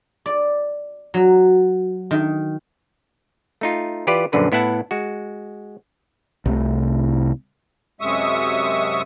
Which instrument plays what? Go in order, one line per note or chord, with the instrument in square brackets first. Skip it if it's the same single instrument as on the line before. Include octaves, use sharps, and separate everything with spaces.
[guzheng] D5
F#3
D#3
[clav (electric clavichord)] A3 D#4 F4
E3 F4 G4 B4 D5
A#1 F#2 D3 B4 C5
A2 B3 E4 E5 F#5 A5
G#3 F#4
[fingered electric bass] C2 C3 A3
[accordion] F#2 C3 G#3 E5 C#6 D#6